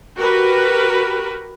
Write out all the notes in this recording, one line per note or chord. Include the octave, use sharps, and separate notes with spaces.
F#4 G4 A#4 B4